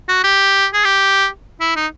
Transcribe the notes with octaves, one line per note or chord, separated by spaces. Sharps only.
F#4
G4
G#4
G4
E4
D#4